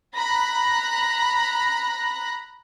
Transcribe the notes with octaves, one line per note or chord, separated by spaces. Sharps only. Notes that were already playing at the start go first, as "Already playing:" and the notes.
A#5 B5 F#6 A#6